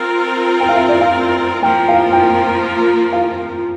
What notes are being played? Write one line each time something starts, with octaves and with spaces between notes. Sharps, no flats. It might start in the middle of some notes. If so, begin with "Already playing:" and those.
Already playing: C4 F4 A#4
G5
F5
E5
D5
F5
F3 A#3 F4 A#4 G5
F5
G5
F5